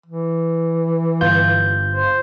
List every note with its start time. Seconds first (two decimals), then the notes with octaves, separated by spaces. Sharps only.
0.06 E3
1.21 G1 F4 G6
1.94 C5